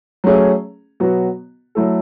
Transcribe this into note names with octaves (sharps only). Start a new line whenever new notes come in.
F#3 A3 C#4 G#4
B2 F#3 B3 F#4
F#3 A3 E4 A4